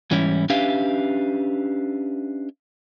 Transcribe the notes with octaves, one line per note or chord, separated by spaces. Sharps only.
G#2 E3 G3 C#4 E4
C#4 D4 G4 B4 E5 F5